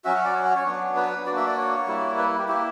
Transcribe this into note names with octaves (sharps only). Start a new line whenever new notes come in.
F#3 C#4 F#4 E5
F#5
D5
C#5
F#5
C#5
F#3 B3 D4
B4
A#3 D4 F#4 D5
E5
D5
C#5
G3 A#3 E4
B4
G4
A#3 E4 G4